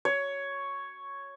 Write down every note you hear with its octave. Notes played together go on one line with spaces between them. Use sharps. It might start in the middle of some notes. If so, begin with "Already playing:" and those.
C#5